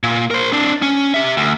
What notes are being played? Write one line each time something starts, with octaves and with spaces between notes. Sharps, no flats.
A#2
A#4 C5
C4 D4
C#4
G4 E5
D2